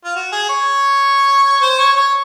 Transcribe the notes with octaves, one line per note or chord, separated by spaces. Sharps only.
F4
F#4
G#4
C#5
C5
C#5
C#5